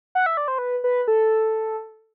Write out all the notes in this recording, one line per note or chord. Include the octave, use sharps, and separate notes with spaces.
F#5
E5
D5
C5
B4
B4
A4